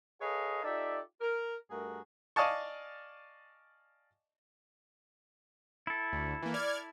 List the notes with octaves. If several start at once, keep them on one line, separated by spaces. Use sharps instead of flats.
G#4 A4 B4 C#5 D#5 F5
D#4 F4 G4 A4 D5 E5
A#4
G2 A3 F#4 G#4 A#4
D5 D#5 F5 G#5 A5 C#6
E4 A4
D2
E3 A#3
D5 F6 G#6